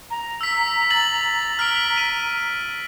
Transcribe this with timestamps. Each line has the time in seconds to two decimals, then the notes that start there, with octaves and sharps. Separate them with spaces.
0.11 A#5
0.41 E6 B6
0.90 A6 F#7
1.59 F6 B6 D7
1.97 D#7